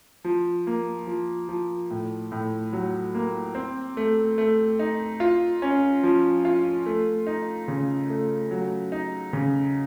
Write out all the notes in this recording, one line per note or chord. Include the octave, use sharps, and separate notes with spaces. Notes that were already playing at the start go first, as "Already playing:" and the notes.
F3
A#3
F3
F3
A2
A2
F#3
A#3
C4
A3
A3
D#4
F4
C#4
F3
F4
A3
D#4
C#3
A3
F#3
D#4
C#3